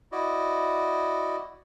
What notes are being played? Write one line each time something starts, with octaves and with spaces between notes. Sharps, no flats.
E4 F#4 D5 D#5